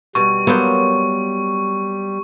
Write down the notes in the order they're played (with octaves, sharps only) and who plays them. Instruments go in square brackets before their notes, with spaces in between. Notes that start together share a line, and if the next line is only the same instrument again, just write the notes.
[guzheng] B2 [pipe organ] G3 [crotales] C#6
[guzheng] F#3 A#3 C5 [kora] B3